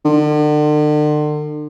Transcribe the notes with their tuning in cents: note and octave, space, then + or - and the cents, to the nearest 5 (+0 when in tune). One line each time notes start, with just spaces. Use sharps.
D3 +40